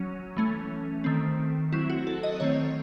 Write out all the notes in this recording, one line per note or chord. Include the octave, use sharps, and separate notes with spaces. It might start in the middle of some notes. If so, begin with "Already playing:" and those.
Already playing: F#3 C#4
E3 A3 C#4
D#3 A3 C4
F#3 C4 E4
F#4
A4
D#5
D#3 A3 C4 C#5